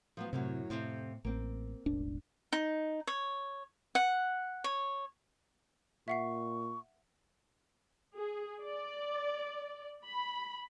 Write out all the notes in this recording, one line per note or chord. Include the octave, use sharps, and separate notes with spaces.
F3 F#3 B3
F#2 A2 C3 F#3
F2 A2 C3
A1 A#3 C4
E1 A1 D4
D#4
C#5
F#5
C#5
A#2 E5 F#5 C#6 C7
G#4
D5
B5